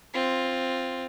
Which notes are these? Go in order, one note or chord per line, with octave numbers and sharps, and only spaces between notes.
C4 F4